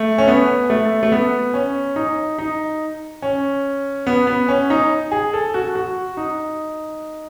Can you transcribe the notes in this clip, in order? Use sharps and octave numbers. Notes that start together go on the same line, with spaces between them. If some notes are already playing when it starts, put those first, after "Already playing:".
Already playing: A3
C#4
B3
A3
A3
B3
C#4
D#4
D#4
C#4
B3
B3
C#4
D#4
G#4
A4
F#4
F#4
D#4